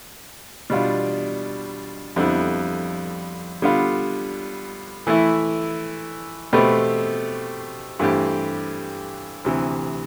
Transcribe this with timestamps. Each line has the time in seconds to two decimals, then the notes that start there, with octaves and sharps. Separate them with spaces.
0.70 B2 G3 D4 F4
2.16 F2 D3 G3 B3 E4
3.62 D3 G3 B3 F4
5.07 E3 A3 E4
6.53 B2 A3 C4 G4 B4
7.99 G2 E3 A3 C4 G4
9.44 D2 C3 E3